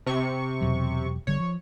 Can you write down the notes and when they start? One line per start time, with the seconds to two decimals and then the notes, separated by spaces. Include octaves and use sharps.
0.06 C3 C#6
0.61 E2 B2 F#3
1.27 G1 D3 G3 C#5
1.40 F3